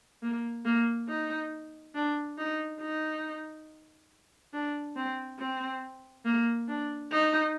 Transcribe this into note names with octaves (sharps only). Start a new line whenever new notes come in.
A#3
A#3
D#4
D4
D#4
D#4
D4
C4
C4
A#3
D4
D#4